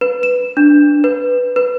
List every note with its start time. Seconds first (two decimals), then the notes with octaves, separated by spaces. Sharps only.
0.01 B4
0.23 E7
0.57 D4
1.04 B4
1.56 B4